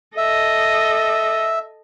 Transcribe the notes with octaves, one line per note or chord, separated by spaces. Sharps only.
A4 D#5 E5